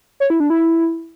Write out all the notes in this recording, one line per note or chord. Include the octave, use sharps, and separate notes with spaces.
C#5
E4
D4
E4